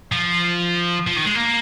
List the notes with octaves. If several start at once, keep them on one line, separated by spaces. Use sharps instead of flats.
F3
F3
D#3
G#3
A#3